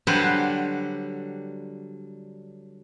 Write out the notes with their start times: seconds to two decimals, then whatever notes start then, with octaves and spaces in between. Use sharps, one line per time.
0.07 D3 F#3 G3 B4 C5 F#5